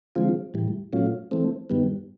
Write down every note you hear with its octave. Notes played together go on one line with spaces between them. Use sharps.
D3 F3 G#3 C4 F4
A2 E3 G3
A#2 F#3 A3 C#4 F4
E3 A3 C4
G2 D#3 G3 B3